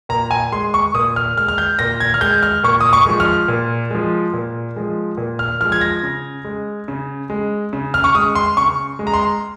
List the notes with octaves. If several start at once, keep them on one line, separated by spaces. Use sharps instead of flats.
A#2 A#5
G#5
G#3 C6
C#6
A#2 D#6
F6
G#3 F6
F6
G6
A#2 A#6
G#6
F6
G#3 G6
F6
A#2 C#6
D#6
C#6
F3 G#3
F6
A#2
F3 G#3
A#2
F3 G#3
A#2
F6
F3 G#3 F6
G#6
A#6
C#3
G#3
C#3
G#3
C#3
F6
C#6
G#3 D#6
C6
C#3 C#6
G#3
A#5
C6